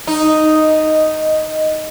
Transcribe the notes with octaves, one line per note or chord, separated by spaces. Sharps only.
D#4 D#6
D#5